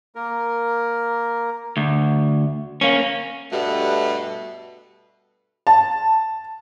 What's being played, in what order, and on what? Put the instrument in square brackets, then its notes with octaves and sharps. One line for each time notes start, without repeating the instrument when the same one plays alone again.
[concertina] A#3 A#4
[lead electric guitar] D2
A#3 C#4
[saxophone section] G2 B2 G3 A3
[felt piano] A5